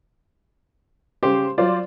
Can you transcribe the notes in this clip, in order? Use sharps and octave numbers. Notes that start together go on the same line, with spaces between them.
C#3 G4 C5
F#3 F4 C5 D5